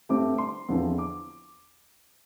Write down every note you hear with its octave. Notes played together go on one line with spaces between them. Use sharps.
G2 D3 A3 C4 D6
C6
E2 D3 F3 C4
D6